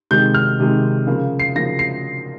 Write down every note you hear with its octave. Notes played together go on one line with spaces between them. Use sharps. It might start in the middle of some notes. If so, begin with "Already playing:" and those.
C3 D#3 G#3 G6
F6
C3 D#3 G#3
C#3 F3 A#3
C7
C#3 F3 A#3 A#6
C7